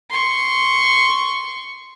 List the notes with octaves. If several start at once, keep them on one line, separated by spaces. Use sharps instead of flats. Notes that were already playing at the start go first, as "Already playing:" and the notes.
C6 C#6